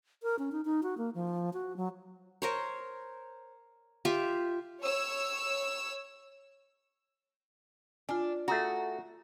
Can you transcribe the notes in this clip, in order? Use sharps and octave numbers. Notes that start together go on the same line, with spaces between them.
A#4
C#4
D#4
D#4
F#4
A#3
F3
F#4
F#3
A#4 C5 C#5
F4 G4 E5 F5
C#5 E6
D4 F4 G#5
A3 F#4 G#4 A#5